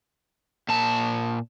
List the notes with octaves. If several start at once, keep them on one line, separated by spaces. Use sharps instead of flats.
A#2 A5